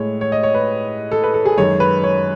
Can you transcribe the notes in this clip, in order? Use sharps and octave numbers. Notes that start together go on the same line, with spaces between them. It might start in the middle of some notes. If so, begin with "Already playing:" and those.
Already playing: A2 G#3 C#5
C#5
D#5
C#5
B4
A4
B4
A4
G#4
F#2 D#3 G#3 C#5
B4
C#5